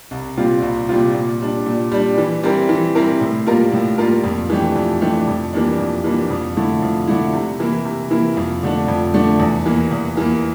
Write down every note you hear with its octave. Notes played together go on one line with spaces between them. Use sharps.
C2
A#2 G3 C4 F4
C2
A#2 G3 C4 F4
A#2
G3 D4
A#2
G3 D4
E3
G3 C4 E4 A#4
E3
G3 C4 E4 A#4
A2
G3 A#3 F4 A#4
A2
G3 A#3 F4 A#4
F2
E3 A3 D4 G4
F2
E3 A3 D4 G4
F2
E3 G3 A#3 D4
F2
E3 G3 A#3 D4
F2
D3 A3 E4
F2
D3 A3 E4
C3
E3 A#3 E4
C3
E3 A#3 E4
F2
D3 A3 D4
F2
D3 A3 D4
E2
E3 A#3
E2
E3 A#3